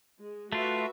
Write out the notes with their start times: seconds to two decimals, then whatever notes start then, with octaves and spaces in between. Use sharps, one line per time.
0.20 G#3
0.52 A3 F4 F#4 B4 E5